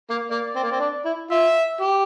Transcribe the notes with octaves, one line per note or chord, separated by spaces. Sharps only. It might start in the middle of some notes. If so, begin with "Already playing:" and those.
A#3
A#3 D5
C4
A#3
C4
D4
E4
F4 E5
G4